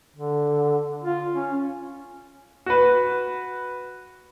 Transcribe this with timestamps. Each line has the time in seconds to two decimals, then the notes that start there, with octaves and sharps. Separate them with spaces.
0.16 D3
1.03 F4
1.33 C#4
2.66 F#4 B4